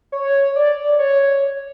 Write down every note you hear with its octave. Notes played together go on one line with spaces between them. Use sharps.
C#5
D5
C#5